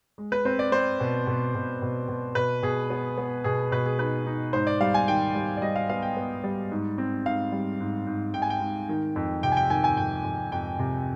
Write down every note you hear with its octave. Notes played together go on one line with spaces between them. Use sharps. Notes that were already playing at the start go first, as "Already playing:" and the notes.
G#3
B4
C4 C5
D5
C4 C5
B2
B2
B2
B2
B2
B2 B4
B2 G#4
B3
B3
B2 G#4
B2 B4
G#4
D#4 B4
D#4
G#2 C5
D5
G3 F5
G#5
D#3 G5
G3
D5
G3 D#5
F5
B3 F5
G5
B3
G3
G#2
C4
G#2 F5
G3
G#2
G#2
G#2 G5
G#5
G5
G#2
D#3
F2
C3 G5
G#5
G5
D#3 G#5
G#5
F2 G5
F2
F2 G5
C3